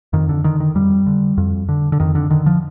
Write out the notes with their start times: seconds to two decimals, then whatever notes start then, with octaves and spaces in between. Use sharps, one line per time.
0.13 F2 D#3
0.29 D3
0.44 D3 D#3
0.60 D#3
0.75 F2 G3
1.06 D3
1.38 F2
1.69 D3
1.92 D3
2.00 F2 D#3
2.15 D3
2.30 D3 D#3
2.46 F3